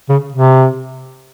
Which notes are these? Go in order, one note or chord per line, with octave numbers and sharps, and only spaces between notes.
C#3
C3